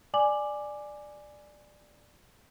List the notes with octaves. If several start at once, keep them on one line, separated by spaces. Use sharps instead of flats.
D5 G#5 D6 F#7